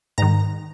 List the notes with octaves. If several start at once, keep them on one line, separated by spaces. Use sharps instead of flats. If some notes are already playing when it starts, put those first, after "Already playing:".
G#2 D#3 A#5